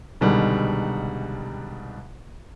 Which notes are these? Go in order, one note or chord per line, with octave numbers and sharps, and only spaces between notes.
C2 B2 D3 D#3 G3 G#3